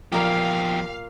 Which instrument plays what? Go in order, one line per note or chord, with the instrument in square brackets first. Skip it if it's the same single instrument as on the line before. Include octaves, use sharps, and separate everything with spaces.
[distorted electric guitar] E2 G4 [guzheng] A#2 A#4 B5 [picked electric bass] F3 [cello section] F5